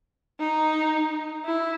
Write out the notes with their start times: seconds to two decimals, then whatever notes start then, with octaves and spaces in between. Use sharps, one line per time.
0.40 D#4
1.45 E4